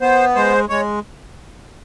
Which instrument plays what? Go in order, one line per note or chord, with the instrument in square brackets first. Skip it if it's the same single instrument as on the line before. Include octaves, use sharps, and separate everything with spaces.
[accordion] B3 C5
G#3 C5
G#3 C#5